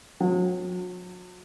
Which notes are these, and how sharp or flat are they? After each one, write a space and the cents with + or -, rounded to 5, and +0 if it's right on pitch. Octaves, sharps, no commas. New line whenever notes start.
F#3 -40